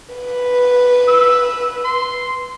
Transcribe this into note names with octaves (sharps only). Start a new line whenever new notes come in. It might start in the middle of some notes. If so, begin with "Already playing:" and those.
B4
E6
C6